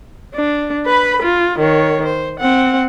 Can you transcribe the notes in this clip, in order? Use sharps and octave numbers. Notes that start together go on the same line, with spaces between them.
D4
B4 B5
F4
D#3 C#5
C5
C4 F#5